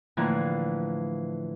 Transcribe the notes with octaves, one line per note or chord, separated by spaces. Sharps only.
A2 D3 E3 F3 A#3